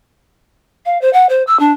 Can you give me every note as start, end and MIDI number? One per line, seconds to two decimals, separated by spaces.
0.86 1.00 77
1.01 1.11 72
1.13 1.26 78
1.29 1.43 72
1.47 1.59 88
1.59 1.72 62